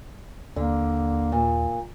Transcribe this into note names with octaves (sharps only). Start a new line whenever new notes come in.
D#2 D3 A#3
A#2